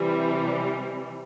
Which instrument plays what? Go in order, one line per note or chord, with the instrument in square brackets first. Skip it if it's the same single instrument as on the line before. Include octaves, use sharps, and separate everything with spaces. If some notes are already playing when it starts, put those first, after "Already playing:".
Already playing: [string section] C3 E3 G3